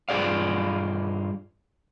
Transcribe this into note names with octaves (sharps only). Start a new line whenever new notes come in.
G2 F4 G#4 D5 F5